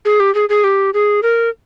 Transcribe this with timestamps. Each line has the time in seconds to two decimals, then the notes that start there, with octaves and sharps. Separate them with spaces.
0.05 G#4
0.20 G4
0.35 G#4
0.49 G#4
0.64 G4
0.94 G#4
1.23 A#4